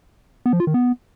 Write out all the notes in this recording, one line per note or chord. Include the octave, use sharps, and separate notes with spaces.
B3
F3
F4
D#3
B3